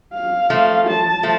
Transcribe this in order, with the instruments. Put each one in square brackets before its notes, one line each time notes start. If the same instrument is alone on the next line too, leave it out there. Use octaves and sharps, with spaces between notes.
[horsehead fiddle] F5
[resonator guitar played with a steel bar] F3 A3
[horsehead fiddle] A5
[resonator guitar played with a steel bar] F3 A3